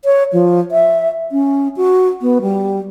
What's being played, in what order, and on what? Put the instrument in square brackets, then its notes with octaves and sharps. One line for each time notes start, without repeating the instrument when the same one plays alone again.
[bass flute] C#5
F3
E5
C#4
F#4
B3
G3